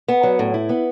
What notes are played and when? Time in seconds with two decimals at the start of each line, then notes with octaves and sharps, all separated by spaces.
0.08 B3
0.23 F#3
0.39 A2
0.54 E4
0.69 B3